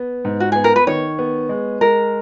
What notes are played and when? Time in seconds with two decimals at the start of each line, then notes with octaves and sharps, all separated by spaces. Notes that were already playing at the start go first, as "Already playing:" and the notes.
Already playing: B3
0.25 G#2
0.40 F#4
0.52 B3 G#4
0.64 A#4
0.76 B4
0.86 D#3 C#5
1.19 B3
1.49 G#3
1.81 G#3 A#4